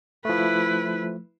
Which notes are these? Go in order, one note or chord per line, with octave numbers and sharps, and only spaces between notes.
F3 A3 E4 B4